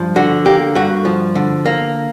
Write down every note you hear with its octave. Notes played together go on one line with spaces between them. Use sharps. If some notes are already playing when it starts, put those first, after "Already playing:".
Already playing: G2 F3
D3 F#4
A#3 G4
G2 F#4
F3
D3
A#3